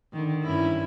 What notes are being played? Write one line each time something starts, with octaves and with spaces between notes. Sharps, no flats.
D3 D#3
G2 C#4 E4